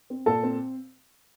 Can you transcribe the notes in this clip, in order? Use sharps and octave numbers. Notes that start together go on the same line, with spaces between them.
C4
A#2 A4 A5
C4